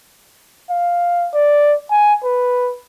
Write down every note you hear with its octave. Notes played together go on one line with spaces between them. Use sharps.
F5
D5
G#5
B4